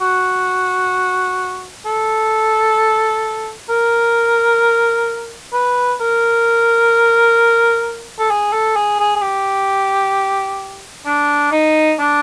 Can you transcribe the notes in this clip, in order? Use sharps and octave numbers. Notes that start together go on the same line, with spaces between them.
F#4
A4
A#4
B4
A#4
A4
G#4
A4
G#4
G#4
G#4
G4
D4
D#4
D4